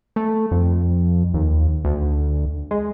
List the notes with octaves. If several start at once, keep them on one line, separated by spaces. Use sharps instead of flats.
A3
F2
D#2
D2
G#3